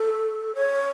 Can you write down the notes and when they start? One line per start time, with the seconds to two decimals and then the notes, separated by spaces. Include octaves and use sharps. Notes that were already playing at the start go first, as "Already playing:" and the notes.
Already playing: A4
0.55 C#5